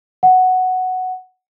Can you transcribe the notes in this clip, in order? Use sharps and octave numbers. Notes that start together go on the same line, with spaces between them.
F#5